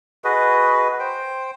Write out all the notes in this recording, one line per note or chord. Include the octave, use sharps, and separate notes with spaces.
F#4 G#4 B4 D#5
C5 G5